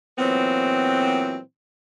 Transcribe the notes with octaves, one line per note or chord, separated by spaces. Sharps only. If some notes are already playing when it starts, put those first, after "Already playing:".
A#2 E3 F#3 B3 C4